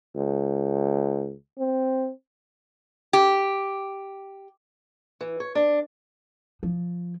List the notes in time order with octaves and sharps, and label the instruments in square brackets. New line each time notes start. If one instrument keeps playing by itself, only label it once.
[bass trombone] C#2
C4
[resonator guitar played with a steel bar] G4
[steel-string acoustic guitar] E3
C#5
D4
[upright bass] F3